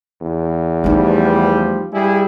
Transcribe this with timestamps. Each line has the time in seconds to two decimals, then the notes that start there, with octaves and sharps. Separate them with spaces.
0.21 E2
0.84 F3 G3 A3 D#4
1.93 G2 G3 E4 G#4